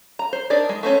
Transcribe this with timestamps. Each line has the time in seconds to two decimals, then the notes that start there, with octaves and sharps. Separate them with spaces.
0.19 A#5
0.33 C5
0.50 D4 D#4 A#4 D5
0.69 G#3
0.83 A3 C4 C#4